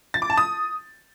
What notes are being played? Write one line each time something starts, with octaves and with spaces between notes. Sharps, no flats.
A6
D6
A5
D#6